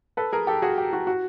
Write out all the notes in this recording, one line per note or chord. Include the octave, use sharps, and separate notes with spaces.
A4 B4
G#4 A#4
G4 A4
F#4 G#4
G4
F#4
F#4